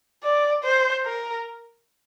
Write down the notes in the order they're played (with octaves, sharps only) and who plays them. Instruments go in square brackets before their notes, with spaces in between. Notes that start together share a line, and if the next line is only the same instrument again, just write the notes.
[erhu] D5
C5
A#4